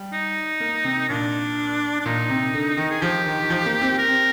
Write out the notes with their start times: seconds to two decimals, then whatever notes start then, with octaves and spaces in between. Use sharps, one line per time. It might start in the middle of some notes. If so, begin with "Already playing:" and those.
Already playing: G3
0.13 D#4
0.60 A#3
0.84 C3
1.08 A#2 D4
2.00 D4
2.05 A#2 D#4
2.30 C3
2.53 D3
2.77 D#3
2.90 G#4
3.02 F3 G4
3.26 D#3
3.40 D#3
3.50 F3
3.66 A#3
3.82 C4
3.98 A#4
4.08 C4